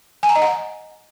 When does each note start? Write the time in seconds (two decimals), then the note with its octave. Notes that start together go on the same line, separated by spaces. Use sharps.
0.23 G#5
0.29 A#5
0.35 D#5
0.42 F#5